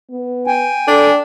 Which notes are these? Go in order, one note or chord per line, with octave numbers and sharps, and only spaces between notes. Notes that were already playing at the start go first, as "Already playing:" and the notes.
B3
G5 G#5
D4 A4